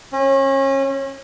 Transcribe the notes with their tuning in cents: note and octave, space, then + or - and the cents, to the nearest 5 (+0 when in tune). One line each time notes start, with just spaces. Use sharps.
C#4 -30